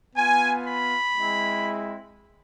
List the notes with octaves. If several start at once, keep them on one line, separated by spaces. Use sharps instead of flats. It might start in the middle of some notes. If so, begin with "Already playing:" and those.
B3 F4 G#5
B5
G#3 C4 E4